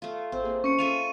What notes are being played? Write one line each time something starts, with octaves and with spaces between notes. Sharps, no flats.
A3 F4
G#1 C4
A#3 G#4
C#4 C#6 C#7
F4 A4 E5 D#7 F7